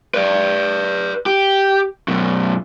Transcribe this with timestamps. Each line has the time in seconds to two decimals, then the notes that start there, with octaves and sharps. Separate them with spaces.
0.14 B4 D5
1.26 G4
2.08 F#2 B2